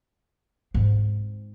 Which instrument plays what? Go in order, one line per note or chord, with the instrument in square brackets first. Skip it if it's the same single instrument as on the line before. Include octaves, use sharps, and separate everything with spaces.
[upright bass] G#2 C4